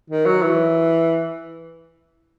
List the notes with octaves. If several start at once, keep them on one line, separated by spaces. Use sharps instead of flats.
D#3
F#3
E3